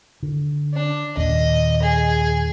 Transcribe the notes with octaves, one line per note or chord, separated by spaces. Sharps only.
D3
D4
D#2 A#2 D#5
G#4